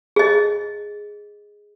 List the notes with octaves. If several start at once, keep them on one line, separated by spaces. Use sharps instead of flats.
G#4 D#5